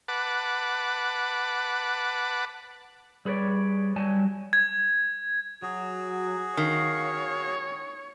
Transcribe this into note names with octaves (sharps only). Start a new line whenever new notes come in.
B4 F#5 A5 D6
G3 G#4 B4 C#5 D5
F#3 G3 G#5 A5
G#6
F#3 F#4 G#4
D#3 C#5 F5